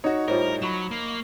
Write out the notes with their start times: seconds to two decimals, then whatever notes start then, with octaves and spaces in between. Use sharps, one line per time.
0.04 D#4 F#4 C#5
0.28 A2 G3 F4 A#4 C5 C#5
0.62 F#3 B5 C#6 E7
0.91 A#3